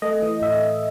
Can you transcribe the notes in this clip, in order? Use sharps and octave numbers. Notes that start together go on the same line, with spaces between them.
A3 D#5
E3
A2 E5